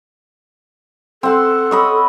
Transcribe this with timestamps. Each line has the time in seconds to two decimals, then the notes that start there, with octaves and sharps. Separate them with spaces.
1.23 C4 A4 F#5 C6
1.71 C#5 D#5 B5